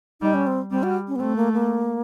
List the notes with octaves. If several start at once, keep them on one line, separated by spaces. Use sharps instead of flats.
G3 D#4
C#4
C4
G3 C4
F#4
C#4
B3
A3 C4
A#3
A#3